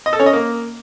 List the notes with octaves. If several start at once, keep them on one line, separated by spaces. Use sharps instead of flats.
D#5
A4
C#4
D#5
A#3